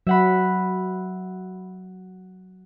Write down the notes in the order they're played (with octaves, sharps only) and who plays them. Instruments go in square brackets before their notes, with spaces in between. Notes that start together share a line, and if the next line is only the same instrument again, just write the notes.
[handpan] F#3 [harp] E5 F#5 B5